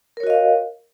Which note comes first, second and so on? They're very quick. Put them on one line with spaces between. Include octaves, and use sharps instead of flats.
A#4 C#5 F#4 D#5 F5